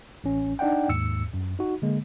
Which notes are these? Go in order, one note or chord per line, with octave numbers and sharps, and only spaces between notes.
A1 C#4
D4 D#4 D5 F#5 G5
D#2 G#2 E6 C#7
F#2
D#4 F#4
D3 G#3 A#3